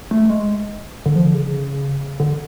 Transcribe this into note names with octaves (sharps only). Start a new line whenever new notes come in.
A3
G#3
D3
F3
D3
C#3
D3